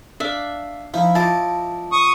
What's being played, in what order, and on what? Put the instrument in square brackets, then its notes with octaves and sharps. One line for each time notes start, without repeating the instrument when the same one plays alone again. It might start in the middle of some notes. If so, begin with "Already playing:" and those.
[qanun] D4 [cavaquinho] E5 F5
[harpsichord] F3 D#4 [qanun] E4
[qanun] F3 [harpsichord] E4 D#5 D6 [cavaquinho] A5
[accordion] C#6 D#6